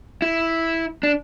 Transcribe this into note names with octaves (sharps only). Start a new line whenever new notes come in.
E4
D4